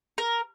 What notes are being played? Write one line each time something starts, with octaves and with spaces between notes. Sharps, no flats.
A#4